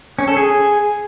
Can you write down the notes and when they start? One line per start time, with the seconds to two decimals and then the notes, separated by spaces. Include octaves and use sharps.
0.19 C#4
0.28 A4
0.37 G#4